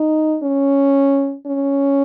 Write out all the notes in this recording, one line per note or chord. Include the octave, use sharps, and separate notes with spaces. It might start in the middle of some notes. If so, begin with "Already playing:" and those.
Already playing: D#4
C#4
C#4